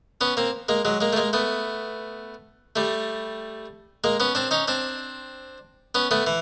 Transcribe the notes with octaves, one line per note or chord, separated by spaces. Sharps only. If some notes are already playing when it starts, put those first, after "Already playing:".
B3 C#4
A#3 C4
G#3 A#3
F#3 G#3
G#3 A#3
A3
G#3 A#3
A3 B3
G3 A3
G#3 A#3
B3 C#4
C4 D4
C#4 D#4
C4 D4
B3 C#4
A3 B3
E3